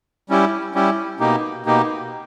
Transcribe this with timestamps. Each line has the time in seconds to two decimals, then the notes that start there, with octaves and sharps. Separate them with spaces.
0.29 G3 C#4 E4 G4
0.75 G3 C#4 E4 G4
1.20 B2 A#3 D#4 G4
1.66 B2 A#3 D#4 G4